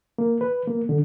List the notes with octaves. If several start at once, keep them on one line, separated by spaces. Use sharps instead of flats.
A#3
B4
A#3
D3